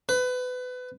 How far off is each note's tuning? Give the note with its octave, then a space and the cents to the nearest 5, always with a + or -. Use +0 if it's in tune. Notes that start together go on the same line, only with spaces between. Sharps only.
B4 +25